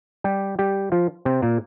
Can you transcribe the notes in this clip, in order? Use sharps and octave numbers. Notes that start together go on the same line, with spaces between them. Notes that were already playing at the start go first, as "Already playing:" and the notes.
G3 G4
G3 G4
F3 F4
C3 C4
A#2 A#3